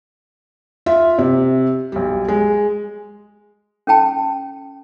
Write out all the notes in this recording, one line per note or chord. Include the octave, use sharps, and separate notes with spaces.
F4 E5
C3
B1 G3
G#3
C#4 A4 G5 A5